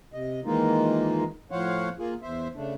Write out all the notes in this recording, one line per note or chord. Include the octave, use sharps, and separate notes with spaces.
C3 D#5
D#3 E3 G#3 A#3 D#4 F4
A2 F3 C5 C#5 F5 F#5
A#3 F4 G#4
E2 C5 E5
C#3 A3 D4